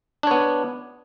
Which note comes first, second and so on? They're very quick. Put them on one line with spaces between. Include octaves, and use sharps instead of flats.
D4 C#5 B3